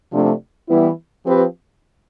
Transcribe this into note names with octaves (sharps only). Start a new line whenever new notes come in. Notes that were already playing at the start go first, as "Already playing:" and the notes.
C3 F3 A3 D4
E3 G3 B3 E4
F3 C4 G4 B4